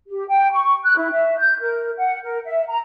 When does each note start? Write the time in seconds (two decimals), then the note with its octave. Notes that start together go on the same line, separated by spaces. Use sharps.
0.08 G4
0.29 G5
0.51 C#6
0.83 F#6
0.97 E4
1.12 E5
1.38 G6
1.60 A#4
1.98 F#5
2.24 A#4
2.46 E5
2.68 A#5